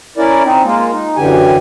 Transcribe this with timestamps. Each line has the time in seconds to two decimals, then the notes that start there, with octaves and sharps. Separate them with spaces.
0.18 C#4 E4 A#4 D5
0.45 C4 D#4
0.65 G#3 A#3 F4
0.92 D#4
1.17 F#2 D3 E3 G4 G#5